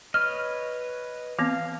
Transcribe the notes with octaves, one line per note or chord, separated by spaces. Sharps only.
B4 C#5 D#5 F6
E3 B3 C4 F5